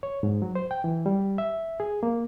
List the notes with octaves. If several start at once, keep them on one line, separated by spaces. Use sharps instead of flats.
C#5
G#2
F#3
C5
G5
E3
G3
E5
G#4
A#3